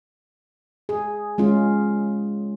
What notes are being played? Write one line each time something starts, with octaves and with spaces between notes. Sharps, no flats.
G#4
G#3 C#4 F4